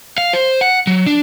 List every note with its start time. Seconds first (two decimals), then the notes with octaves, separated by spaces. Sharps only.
0.18 F5
0.33 C5
0.61 F#5
0.87 F#3
1.07 D4